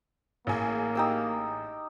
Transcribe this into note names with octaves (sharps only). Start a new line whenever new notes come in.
A1 A#3 G#4
D#4 G4 E6